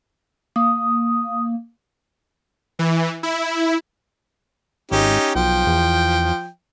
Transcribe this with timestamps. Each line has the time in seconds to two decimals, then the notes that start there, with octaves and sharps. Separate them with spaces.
0.56 A#3 D#6
2.79 E3
3.23 E4
4.91 G#1 C#4 D#4 G4
5.35 B1 F3 G5
5.67 E2